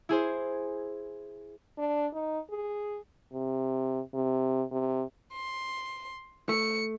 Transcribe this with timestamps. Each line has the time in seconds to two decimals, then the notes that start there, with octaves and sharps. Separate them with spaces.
0.09 E4 G#4 C5
1.78 D4
2.13 D#4
2.51 G#4
3.32 C3
4.14 C3
4.71 C3
5.33 C6
6.49 A3 C#7